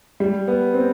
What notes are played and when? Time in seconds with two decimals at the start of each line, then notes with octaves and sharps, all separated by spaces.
0.20 G3
0.48 B3
0.74 C4